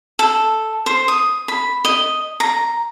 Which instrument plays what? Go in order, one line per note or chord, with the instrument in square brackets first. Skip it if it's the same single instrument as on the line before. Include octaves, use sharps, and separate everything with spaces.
[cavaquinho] A4
C5
D#6
B5
D#5
A#5